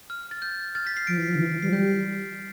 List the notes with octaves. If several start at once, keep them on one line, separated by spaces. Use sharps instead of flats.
F6
A6
G6
F6 A6
G6 B6
A6 C7
F3 B6 D7
E3
F3
D3
E3
E3
G3 C7
F3
G3 G6 B6